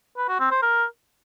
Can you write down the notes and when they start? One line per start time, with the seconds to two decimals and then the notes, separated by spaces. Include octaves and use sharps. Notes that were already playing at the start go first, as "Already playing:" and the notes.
0.17 B4
0.29 F#4
0.40 C4
0.51 C5
0.62 A#4